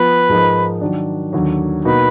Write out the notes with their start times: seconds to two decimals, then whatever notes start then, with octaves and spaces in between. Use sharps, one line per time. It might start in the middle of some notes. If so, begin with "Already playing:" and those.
Already playing: F3 B3 F4 B4
0.29 G#2 F3 G#3 D#4 A#4
0.81 D#3 F#3 D4
1.33 D#2 D3 F#3
1.85 B2 A#3 D#4 F#4 B4